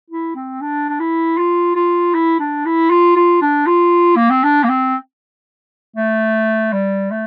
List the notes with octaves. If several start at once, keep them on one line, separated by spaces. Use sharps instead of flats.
E4
C4
D4
D4
E4
F4
F4
E4
D4
E4
F4
F4
D4
F4
A#3
C4
D4
A#3
C4
A3
G3
A3